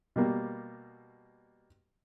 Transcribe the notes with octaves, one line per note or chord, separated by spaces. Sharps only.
B2 G3 A#3